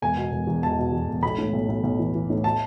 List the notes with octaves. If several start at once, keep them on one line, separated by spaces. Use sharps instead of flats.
E1 G#5
B2
E1
E2
E1 A5
B2
E2
E1
B1 B5
A2
B1
B1
B1
E3
E3
A2
A5